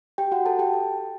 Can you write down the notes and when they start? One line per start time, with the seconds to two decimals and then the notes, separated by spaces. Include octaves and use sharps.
0.18 G4 G5
0.32 F#4 F#5
0.46 A4 A5
0.59 G4 G5
0.73 A4